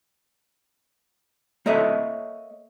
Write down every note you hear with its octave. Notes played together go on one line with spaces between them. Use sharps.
A#3 A4 C#5 D#5 E5